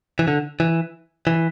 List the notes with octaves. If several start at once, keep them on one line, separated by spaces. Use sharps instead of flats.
E3
D3
E3
E3